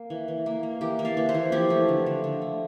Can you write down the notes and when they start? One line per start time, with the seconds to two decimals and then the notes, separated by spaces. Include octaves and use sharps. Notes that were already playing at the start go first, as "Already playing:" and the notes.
Already playing: A#3
0.10 E3
0.28 E3
0.46 A#3
0.63 A#3
0.81 E3 G4 A#4
0.99 A#3
1.05 F5 A5
1.17 E3
1.29 C5 E5
1.34 E3
1.52 F3 E4 G4
1.70 A3
1.88 D3
2.06 D3
2.24 D3
2.42 A3